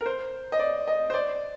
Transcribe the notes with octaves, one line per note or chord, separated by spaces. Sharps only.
A#4
C5
D#5
D5
D#5
C5
D5